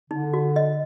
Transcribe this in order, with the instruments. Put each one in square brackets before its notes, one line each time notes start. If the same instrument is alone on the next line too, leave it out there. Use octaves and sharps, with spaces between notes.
[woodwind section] D3 [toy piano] D#4
[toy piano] F#4
D#5